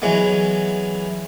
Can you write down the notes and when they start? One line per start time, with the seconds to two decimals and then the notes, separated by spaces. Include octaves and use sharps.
0.02 E3 F#3 G#3 B3